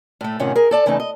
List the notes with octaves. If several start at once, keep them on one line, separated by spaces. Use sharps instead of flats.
A2 A3
A2 C3 D#3 C#4 F4 F#5
G#4 A#4
A4 D5 A5
E2 C#3 E3 A3 D#4
D#5